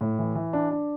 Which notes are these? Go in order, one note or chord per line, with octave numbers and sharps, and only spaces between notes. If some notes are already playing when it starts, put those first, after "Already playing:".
A2
E3
E3
D4
D4